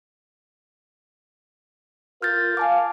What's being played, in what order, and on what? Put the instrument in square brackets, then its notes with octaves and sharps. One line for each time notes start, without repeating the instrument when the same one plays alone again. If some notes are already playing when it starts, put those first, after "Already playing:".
[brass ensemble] F4 A#4 [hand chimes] F6 G6 A6
[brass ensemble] F5 [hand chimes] G#5 A5 D6